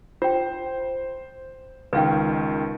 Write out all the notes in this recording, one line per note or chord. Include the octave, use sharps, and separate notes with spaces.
F4 C5 G5
C#2 D#3 B4 F5 G5